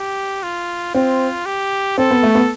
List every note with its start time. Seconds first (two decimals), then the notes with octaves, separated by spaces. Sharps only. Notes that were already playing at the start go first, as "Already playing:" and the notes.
Already playing: G4
0.43 F4
0.95 C4 F4
1.46 G4
1.98 C4 A4
2.11 B3
2.23 A3
2.35 B3